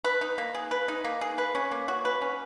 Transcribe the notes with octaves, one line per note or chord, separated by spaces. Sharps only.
B4
D#4
A#3
G#4
B4
D#4
A#3
G#4
B4
C#4
A#3
F#4
B4
C#4